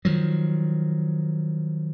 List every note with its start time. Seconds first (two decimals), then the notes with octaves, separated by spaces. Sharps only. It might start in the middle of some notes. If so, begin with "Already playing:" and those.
0.05 D#3 F3 F#3